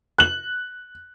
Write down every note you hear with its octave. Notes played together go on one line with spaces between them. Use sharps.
F#6 F#7